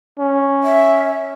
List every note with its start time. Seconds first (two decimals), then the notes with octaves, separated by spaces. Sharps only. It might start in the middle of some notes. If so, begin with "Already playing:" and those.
0.19 C#4
0.63 E5